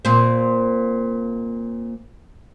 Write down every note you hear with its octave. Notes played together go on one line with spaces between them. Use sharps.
A#2 C4